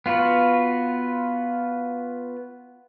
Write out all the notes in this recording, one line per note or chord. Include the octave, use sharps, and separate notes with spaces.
B3 F4 F#4 B4